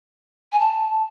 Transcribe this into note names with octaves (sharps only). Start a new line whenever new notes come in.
G#5
A5